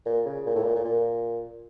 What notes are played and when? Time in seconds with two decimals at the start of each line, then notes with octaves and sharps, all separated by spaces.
0.06 A#2
0.25 C#3
0.46 A#2
0.55 A2
0.64 A#2
0.75 A#2
0.85 A#2